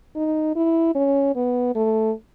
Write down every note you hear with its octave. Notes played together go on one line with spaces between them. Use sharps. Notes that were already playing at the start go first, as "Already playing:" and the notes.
D#4
E4
C#4
B3
A3